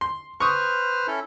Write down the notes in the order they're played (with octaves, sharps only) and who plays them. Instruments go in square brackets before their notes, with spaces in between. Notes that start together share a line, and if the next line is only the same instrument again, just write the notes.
[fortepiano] C6
[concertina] B4 C5 F6 [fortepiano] C#6 D#6
[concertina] C#4 E4 A4